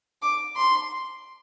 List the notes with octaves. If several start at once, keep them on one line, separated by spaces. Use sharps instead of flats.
D6
C6